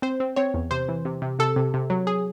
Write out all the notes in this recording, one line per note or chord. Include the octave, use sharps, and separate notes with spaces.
C4 C5
C4
C4 C#5
E2
C3 C5
E3
C3
C3
C3 A4
C3
C3
F#3
G#4